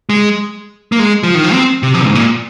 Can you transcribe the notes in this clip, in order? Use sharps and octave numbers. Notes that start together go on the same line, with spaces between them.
G#3
A#3
G#3
F3
D#3
F3
C4
C3
F3
G#2
A#2